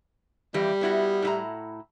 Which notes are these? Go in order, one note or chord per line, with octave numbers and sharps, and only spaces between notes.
F2 E3 G3 G4
B3 E4 F#4
A2 E4 A#5